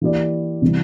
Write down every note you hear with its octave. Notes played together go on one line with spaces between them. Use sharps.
E3 A#3 E4 G4 D5
C3 E3 G3